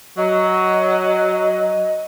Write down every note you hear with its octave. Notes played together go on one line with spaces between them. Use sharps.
F#3 D#5